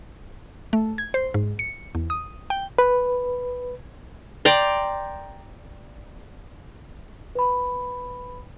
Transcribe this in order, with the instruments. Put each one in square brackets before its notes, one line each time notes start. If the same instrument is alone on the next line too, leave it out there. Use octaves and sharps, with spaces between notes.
[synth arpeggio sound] A3
G#6
C5
G#2
C#7
E2
D#6
G5
[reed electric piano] B4
[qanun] D5 G5 A#5 C6
[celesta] B4 B5